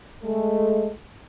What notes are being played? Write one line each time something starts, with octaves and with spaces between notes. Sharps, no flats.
G#3 A3 A4